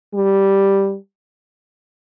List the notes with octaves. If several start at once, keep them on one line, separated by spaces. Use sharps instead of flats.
G3